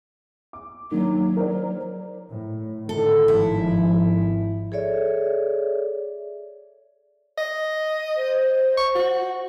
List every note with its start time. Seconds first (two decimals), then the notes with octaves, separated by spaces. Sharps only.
0.53 D6
0.91 D#3 F#3 A#3 D4
1.37 A#4 C5 D5
2.30 A2
2.89 A2 D3 D#3 A4
3.28 G#1 G#2 F3 E4
4.72 G#4 A4 C#5 D5 E5
7.38 D#5
8.16 C5
8.78 C#6
8.95 F#4